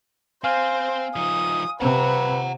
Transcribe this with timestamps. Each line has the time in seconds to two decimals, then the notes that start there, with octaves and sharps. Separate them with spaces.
0.44 C4 C5 F5 G#5 F6
1.16 F3 D#4 D#6
1.81 C3 B4 F#5 A#5